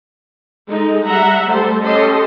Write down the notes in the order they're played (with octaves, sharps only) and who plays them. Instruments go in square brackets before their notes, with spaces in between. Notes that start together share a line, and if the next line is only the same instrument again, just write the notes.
[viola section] G#3 D#4 A4
G3 E5 F#5 A#5
G3 A3 A4 C5
C#4 G4 A4 D#5 C6